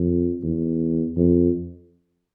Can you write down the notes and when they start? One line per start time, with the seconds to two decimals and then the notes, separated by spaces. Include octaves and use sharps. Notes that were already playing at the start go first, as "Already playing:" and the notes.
Already playing: F2
0.43 E2
1.17 F2